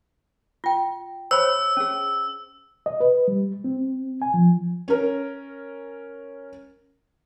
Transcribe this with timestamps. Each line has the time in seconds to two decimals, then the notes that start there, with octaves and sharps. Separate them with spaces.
0.64 F4 G5
1.31 C5 C#5 B5 E6
1.77 C#4 G#4
2.86 D#5
3.00 B4
3.28 G3
3.64 C4
4.22 G#5
4.34 F3
4.88 C#4 A#4